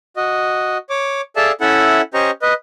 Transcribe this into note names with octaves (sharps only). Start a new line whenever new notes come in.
F#4 D#5
C#5 D6
G#4 A4 D5 E5 F5 A5
C#4 E4 A4 E5 F#5
C#4 G4 C5 D#5 A#5 C#6
B4 D#5